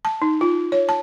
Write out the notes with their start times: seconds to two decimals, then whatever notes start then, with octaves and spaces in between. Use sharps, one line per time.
0.05 A5
0.22 D#4
0.41 F4
0.72 C#5
0.89 A5